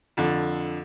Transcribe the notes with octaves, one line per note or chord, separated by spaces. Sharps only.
F2 D3